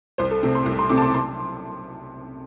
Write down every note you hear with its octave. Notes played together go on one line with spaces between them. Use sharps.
C2 C5
A4
C3 A3 C4
C6
C2
C6
C3 A3 C4 D6
A5
C6
C6